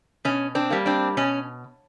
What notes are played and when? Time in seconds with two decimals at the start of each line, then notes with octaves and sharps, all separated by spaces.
0.25 B2 C#4
0.55 C4 D4
0.70 G3 A#3
0.86 C4 D4
1.17 B2 C#4